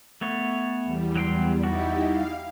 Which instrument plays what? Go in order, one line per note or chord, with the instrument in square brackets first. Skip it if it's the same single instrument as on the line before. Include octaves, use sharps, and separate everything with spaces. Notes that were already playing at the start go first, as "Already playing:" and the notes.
[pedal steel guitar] A3 B3 C#5
[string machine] E2 G3
[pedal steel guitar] F#3 G5 C6
[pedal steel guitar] G3 F#4 [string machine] D#4 E4 G4
[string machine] F5